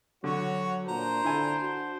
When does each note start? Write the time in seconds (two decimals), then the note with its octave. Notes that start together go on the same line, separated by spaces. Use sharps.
0.24 D3 F#3 F#4 C#5
0.89 A#2 D4 C5 A#5
1.24 D3 E4 G#5 A5
1.61 F#4